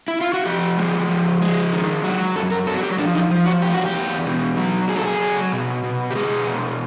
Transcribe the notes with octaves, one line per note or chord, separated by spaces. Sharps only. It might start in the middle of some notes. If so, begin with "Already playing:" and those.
E4
F4
F#4
F3 G4
G#3
F3
G#3
D#3
F#3
F#2 A4
A#4
F#3 A4
F#4
G4
F3 D4
D#4
F3
F#4
E2 G4
F#4
G4
E2
B2
F#3
F#3 G#4
A4
G#4
F#3
B2
B2
G4
G#3 G#4
B2